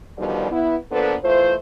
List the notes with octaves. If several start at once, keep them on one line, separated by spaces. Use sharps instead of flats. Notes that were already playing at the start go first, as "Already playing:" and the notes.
B2 D3 D#3 F3 G3
B3 E4
A#2 F3 B3 D4 A4 B4
E3 A3 F4 C5